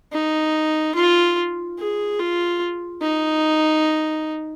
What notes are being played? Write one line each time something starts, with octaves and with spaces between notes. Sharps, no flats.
D#4
F4
G#4
F4
D#4